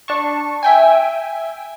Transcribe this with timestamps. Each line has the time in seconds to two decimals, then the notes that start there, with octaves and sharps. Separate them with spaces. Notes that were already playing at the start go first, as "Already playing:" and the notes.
0.08 D4 A5 C#6
0.63 E5 G5 G#5